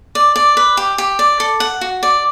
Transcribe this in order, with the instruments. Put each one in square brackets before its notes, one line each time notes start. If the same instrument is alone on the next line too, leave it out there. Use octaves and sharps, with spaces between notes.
[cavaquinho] D5
D5
B4
G4
G4
D5
A4
F#5
F#4
D5